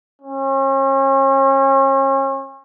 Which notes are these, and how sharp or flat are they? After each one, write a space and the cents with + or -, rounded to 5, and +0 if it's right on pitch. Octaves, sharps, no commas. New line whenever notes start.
C#4 -40